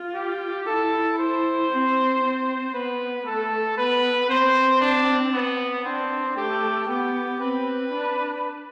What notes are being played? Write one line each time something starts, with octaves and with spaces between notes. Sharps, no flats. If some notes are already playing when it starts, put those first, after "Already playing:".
Already playing: F4
G4
E4 A4
C5
C4
C4
B3 B4
A3 A4
B3 B4
C4 C5
D4
B3
C4 D4
A3 G4
B3 G4
C4 B4
D4